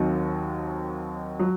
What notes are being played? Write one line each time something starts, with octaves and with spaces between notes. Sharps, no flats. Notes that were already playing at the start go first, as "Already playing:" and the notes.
Already playing: D#2 D#3 F#3 C4 F#4
F#3